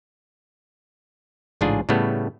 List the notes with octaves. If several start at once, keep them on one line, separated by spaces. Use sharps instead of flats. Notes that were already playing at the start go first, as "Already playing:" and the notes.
A1 G#2 C#3 D4 F4 G#4
A2 C#3 G3 A3 B3